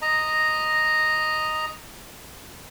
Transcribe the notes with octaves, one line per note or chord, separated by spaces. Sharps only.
D#5 A#5